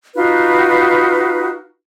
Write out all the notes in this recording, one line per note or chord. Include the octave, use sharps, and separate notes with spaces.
D#4 F4 F#4 B4